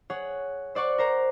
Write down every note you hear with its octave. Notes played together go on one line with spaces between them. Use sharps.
G#4 C#5 F#5
C5 D5 F#5 C#6
A#4 C5 A#5